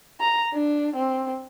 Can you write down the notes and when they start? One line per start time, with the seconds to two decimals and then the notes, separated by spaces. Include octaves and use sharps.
0.20 A#5
0.54 D4
0.96 C4